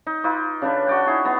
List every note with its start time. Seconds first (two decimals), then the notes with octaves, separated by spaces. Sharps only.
0.07 D#4
0.24 D#4 F4 B4 D6
0.62 C#3 D4 A4 B4
0.87 F#4 D5 G5
1.06 D#4 E4 G#4 C#6
1.24 B3 A4 A#5